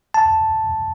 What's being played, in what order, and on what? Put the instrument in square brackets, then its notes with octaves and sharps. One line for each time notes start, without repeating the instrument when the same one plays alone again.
[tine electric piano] A5